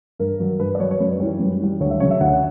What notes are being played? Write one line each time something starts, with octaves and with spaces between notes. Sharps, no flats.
G2 A#4
F#3
G2 B4
D5
F#3 C#5
C#5
F#2 B4
E3 G3
F#2
E3 G3
D2 C#5
E5
C#3 F#3 C#5
E5
D2 F#5
F#5